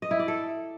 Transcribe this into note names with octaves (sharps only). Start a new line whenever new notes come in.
D#5
E4
D5
A4